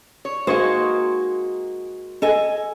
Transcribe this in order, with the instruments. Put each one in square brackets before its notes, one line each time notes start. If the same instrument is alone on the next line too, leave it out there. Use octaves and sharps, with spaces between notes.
[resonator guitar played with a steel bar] C#5
[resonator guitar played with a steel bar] G#3 A#3 D#4 [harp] F#4 G#5 C#6 [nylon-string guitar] C5
[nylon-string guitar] A4 D#5 G#5